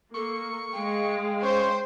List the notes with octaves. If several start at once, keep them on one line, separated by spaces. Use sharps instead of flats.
A#3 A4 C#6
G#3 F5 G5
C#4 C5